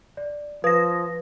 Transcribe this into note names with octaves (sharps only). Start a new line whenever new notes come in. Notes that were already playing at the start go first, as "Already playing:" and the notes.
D5
F3 B4 D#6 A#6